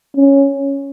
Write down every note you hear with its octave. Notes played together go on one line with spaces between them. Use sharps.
C#4